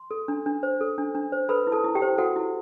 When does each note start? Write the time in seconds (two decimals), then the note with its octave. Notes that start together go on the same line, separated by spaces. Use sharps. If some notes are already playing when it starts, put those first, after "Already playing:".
Already playing: C6
0.11 A4
0.28 D4
0.46 D4
0.63 C5
0.81 A4
0.98 D4
1.15 D4
1.32 C5
1.49 A4 B4 B5
1.67 E4
1.72 A4 A5
1.84 E4
1.95 G4 G5
2.02 C5
2.18 F#4 A4 F#5
2.36 E4